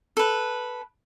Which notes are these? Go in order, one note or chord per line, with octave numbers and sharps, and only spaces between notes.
A4 B4